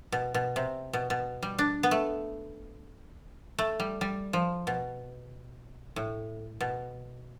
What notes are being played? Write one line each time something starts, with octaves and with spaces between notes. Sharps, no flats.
B2
B2
C3
B2
B2
G3
D4
B3
A3
A3
G3
G3
F3
B2
A2
B2